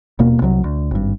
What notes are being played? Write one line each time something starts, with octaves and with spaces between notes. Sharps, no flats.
D#1 B2 A#3
C2 C3 F#3
D2
G#1 G2